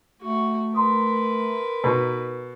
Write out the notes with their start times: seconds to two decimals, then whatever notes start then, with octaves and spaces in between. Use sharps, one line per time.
0.21 A3 F#4
0.75 A#4 B4 A#5 C6 D#6
1.84 B2 D#4